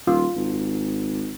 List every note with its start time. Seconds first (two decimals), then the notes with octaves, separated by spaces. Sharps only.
0.07 D#1 F4
0.36 G#1